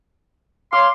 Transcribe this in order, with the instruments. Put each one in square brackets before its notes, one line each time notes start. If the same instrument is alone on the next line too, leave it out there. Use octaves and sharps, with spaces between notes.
[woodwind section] C#5 F5 C6 [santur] D6